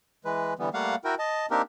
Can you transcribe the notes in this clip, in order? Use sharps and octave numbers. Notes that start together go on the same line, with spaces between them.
E3 G#3 B4
D3 E3 G3 B3
G3 A3 A#3 F5 F#5
E4 F#4 A#4 G5
D#5 A5
A#3 C4 D4 D#4 G4 A#4